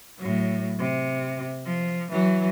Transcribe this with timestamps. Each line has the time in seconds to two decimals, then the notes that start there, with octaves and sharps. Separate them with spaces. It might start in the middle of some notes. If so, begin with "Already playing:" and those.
0.18 A2 F#3
0.79 C3
1.66 F3
2.11 E3 F#3